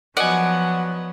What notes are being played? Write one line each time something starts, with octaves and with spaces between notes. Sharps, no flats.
F3 F#3 B3 D5 D#5 F#5 G#5